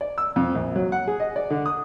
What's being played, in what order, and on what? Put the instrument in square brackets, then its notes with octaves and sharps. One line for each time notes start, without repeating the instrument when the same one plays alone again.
[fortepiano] D5
E6
F2
A#1
F#3
F#5
G#4
D#5
D5
D3
D#6